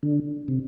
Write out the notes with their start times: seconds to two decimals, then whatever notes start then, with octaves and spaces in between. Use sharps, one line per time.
0.03 D3
0.48 C3